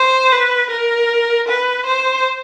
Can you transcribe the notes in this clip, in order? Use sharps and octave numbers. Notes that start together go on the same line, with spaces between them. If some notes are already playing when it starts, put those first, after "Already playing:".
Already playing: C5
B4
A#4
B4
C5